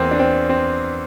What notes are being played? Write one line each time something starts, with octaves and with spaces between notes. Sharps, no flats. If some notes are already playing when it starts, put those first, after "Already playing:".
Already playing: E2 E3 A#3 C4
D4
C4
C4